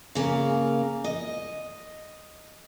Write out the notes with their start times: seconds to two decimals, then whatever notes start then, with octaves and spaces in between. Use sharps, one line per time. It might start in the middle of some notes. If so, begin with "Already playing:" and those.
0.15 C#3 A#3
1.04 D#5